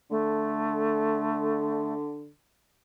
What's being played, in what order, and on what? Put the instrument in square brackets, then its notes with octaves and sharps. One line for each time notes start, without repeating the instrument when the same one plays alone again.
[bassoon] D3 [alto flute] A3